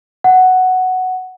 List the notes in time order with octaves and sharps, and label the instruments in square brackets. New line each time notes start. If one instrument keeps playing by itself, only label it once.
[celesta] F#5